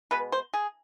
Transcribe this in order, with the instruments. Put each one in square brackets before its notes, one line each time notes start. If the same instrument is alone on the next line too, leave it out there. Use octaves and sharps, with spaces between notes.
[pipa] B2 G#3 B3 B4
C5
G#4